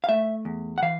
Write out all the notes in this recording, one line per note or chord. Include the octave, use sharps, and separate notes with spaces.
F5
A3 E5
E2
F#5
E3 F5